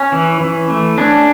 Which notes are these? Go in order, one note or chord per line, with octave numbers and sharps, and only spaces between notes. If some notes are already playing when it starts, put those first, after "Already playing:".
Already playing: C#4
E3
E3
A3
C#4 D4